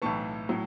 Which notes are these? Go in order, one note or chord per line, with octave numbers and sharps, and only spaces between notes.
B1 A2 E3 A5 C#6
A2 F#3